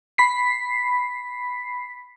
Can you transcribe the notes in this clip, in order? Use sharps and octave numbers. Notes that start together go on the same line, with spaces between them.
B5 B6 C7